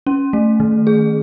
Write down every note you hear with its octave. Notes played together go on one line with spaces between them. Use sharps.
C#4
A3
D#3
G#4